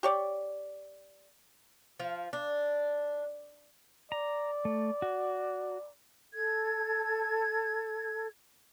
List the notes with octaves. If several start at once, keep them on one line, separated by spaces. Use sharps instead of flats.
G4 C#5 D5
F3
D4
D5 A#5
A3
F#4
A4 G#6